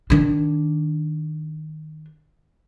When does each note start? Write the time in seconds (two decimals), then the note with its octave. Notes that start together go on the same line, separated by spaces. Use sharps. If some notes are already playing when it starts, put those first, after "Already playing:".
0.10 D#3 D4